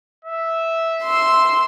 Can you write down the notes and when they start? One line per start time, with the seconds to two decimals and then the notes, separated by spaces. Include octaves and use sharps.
0.25 E5
1.03 C6 E6